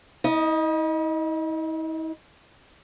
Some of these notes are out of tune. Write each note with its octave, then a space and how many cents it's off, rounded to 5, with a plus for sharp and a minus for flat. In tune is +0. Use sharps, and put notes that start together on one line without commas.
E4 -45 D#5 +0